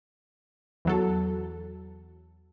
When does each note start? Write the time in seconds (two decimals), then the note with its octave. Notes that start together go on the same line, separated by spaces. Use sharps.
0.85 E2 F#3 A4